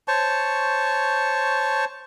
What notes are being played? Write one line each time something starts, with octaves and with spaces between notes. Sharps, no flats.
C5 C#5 A5 C#6